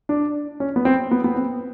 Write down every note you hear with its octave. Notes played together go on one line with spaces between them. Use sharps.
D4
C#4
B3
C4
B3
B3
C4